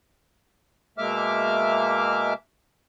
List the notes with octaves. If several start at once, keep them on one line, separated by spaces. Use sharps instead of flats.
B2 G#3 A#3 E5 D6 F6